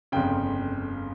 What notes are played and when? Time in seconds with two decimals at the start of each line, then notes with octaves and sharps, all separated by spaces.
0.12 G1 F2 C#3 G5